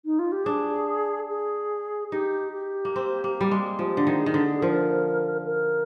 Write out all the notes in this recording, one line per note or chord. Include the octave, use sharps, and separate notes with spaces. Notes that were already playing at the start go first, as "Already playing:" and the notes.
D#4
F4
G4
D4 G#4
G#4
D#4 G4
G4
A#3
C4
A#3
G3
G#3
F3 G4
D3
D#3
G#4
D#3
D3
G#4
F3 A#4
A#4